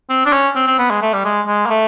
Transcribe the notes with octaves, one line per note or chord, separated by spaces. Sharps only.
C4
D4
C#4
C4
C4
B3
G#3
A3
G3
G#3
G#3
A#3
A3